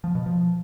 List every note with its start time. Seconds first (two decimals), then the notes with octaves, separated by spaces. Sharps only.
0.04 F3
0.15 B2
0.26 F3